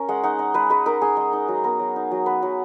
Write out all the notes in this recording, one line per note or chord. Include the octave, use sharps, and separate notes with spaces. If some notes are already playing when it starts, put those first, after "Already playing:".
Already playing: C#4 A#4
G#3 F#5
D#4 F#5
D#4
G#3 B4
G#3 B4
D#4 A#4
D#4 G#4
G#3
D#4
F#3
B3 A#4
F#3
D#4
F#3
B3 B4
F#3